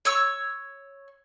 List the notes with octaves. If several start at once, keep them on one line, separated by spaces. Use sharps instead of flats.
C#5 C#6 E6